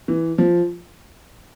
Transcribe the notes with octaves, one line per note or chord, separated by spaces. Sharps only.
E3
F3